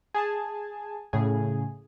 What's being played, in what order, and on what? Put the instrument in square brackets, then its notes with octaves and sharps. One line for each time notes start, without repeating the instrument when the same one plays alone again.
[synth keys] G#4 G#5 A5
A2 C#3 G#4